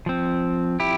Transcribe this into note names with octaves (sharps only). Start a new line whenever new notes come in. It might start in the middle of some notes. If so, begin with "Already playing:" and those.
F3 C4
E4 G4